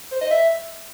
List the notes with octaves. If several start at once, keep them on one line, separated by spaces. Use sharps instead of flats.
C5
D#5
E5